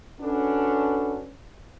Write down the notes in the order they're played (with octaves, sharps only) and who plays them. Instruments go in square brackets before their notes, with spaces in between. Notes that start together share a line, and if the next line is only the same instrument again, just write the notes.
[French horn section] C#4 D4 F#4 A4 B4